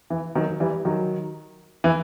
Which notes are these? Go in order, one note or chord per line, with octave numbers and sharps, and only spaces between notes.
E3
D#3 F#3
E3 G3
D#3 F#3
E3